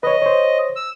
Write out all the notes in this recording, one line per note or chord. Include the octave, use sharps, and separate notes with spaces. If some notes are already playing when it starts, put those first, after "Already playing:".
B4 C#5 D#5
C5 C#5
E6